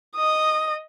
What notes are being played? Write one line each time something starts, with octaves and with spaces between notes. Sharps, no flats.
D#5 D#6